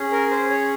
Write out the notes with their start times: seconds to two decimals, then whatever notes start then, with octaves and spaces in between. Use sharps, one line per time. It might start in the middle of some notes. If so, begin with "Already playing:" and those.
Already playing: C#4 G#4
0.12 A#4
0.31 C5
0.50 C#5